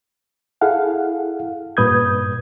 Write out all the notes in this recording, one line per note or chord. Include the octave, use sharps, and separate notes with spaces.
E4 G#4 A4 F5 F#5
G2 A#2 B4 D#6 G6 G#6